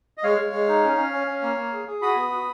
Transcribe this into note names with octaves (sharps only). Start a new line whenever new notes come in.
D#5
G#3 C#5 F5
G#3
G#3
D#4
C#4
C#4
C#4
C#4
A#3
A#3
G#4
G#4
F#4 B5 D#6
B3
F#4